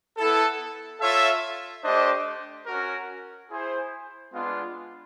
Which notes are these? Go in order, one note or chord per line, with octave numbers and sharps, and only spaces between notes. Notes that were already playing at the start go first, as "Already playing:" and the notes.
B3 E4 A4
F4 A4 C#5 E5
A3 D4 G4 C5 D#5
C#4 F#4 A#4
E4 G#4 C5
G#3 B3 D4 F4